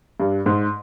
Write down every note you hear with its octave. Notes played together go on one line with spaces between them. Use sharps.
G2
G#2